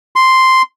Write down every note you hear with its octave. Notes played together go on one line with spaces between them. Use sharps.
C6